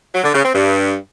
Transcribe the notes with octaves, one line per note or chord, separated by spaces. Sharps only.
F#3
D3
C#3
C4
G2